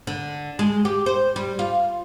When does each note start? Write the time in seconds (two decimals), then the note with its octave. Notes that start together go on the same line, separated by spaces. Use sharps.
0.07 D3
0.59 G#3
0.85 G4
1.06 C5
1.36 G3
1.59 F4